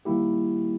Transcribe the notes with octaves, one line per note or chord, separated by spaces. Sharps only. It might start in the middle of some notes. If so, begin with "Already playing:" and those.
D#3 G3 A#3 E4 G4